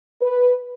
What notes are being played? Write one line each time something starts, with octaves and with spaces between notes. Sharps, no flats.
B4